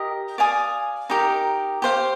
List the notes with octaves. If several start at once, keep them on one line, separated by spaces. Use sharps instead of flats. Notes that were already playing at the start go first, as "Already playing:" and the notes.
Already playing: G4 A#4 D#5
D5 F5 G#5 D#6
D#4 G4 A#4
G4 C5 F5